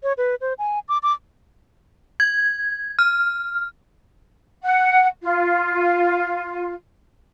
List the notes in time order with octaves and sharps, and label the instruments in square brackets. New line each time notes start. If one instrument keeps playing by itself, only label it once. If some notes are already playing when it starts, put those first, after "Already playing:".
[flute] C#5
B4
C5
G#5
D6
D6
[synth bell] G#6
F6
[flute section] F#5
F4